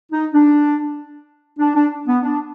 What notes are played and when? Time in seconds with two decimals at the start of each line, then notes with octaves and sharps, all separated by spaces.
0.12 D#4
0.33 D4
1.59 D4
1.75 D4
2.07 B3
2.23 D4